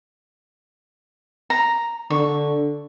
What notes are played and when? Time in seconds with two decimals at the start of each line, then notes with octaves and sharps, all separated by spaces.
1.50 A#5
2.10 D3 C#6